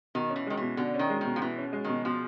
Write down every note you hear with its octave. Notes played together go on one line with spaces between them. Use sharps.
B2 D#3
C#4
E3
D#3 G#3
B2 E3
B2 D3
C#4
D#3
G#3
B2 D#3
F3
B2 E3
C#4
G#3
B2 D#3
B2 F3